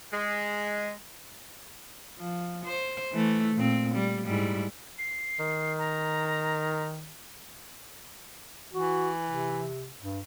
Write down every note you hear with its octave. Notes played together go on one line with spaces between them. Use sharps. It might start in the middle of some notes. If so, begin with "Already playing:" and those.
G#3
F3
C5
E3 A3
A#2 C4
G3
G#2 G3 E4
C7
D#3
A#5
E3 F#4
C3
G2